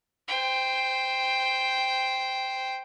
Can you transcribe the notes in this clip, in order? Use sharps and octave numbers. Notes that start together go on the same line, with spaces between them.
C5 G5